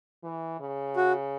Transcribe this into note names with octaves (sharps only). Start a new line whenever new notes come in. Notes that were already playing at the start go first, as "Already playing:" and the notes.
E3
C#3
F#4